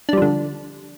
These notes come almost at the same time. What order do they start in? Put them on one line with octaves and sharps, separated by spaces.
D4 G3 F3 D3